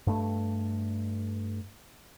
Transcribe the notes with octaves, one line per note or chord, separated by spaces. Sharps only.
G2 A3